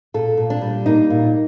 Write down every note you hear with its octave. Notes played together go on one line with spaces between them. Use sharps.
A#2 A4
A#2
D4
G3
A#3 D#4
A#2